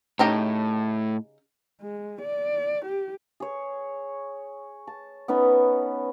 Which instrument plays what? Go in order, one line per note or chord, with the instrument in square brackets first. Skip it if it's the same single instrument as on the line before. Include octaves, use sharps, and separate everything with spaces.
[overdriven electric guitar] A2 [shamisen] C#3 D#4 G4
[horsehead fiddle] G#3
D5
G4
[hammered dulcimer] G#4 C#5
A5
B3 C#4 D#4 B4